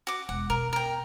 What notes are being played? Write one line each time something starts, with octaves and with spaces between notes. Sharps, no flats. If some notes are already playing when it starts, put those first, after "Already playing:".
F#4 D6
E1 F#5
B2 A#4
A#4 G5